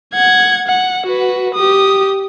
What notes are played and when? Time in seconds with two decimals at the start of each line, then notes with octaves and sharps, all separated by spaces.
0.14 F#5 G#6
0.68 F#5
1.06 F#4 B4
1.54 G4 D#6